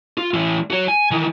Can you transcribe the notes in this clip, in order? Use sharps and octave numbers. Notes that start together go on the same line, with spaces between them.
F4
A2 E3
F#4 C#5
G#5
D#3 E3